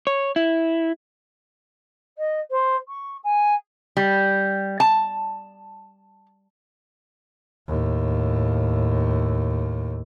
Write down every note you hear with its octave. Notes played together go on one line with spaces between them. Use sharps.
C#5
E4
D#5
C5
C#6
G#5
G3
A5
D#2 A2